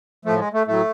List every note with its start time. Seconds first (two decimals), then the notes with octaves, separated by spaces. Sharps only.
0.25 A2 F3 A3
0.39 G#3
0.53 A3
0.67 A2 F#3 A3